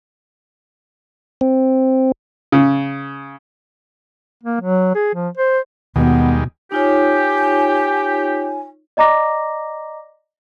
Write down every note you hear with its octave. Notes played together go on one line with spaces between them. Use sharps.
C4
C#3
A#3
F#3
G#4
F3
C5
D#2 B2 D#3 G3 G#3 B3
D#4 F4 G4 C#5 G#5
D5 D#5 A#5 D6 A#6